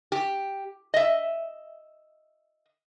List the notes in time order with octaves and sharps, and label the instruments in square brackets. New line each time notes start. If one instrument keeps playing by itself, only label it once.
[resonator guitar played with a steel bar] G4
D#5 E5